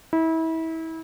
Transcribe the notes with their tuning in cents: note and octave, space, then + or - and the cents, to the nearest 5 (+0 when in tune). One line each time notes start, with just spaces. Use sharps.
E4 -30